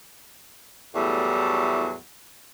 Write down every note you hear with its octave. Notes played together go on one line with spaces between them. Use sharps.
E2 A2 F#3 G3 A3